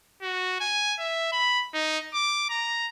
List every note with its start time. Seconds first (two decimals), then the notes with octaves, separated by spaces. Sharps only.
0.22 F#4
0.61 G#5
0.99 E5
1.32 B5
1.74 D#4
2.14 D6
2.50 A#5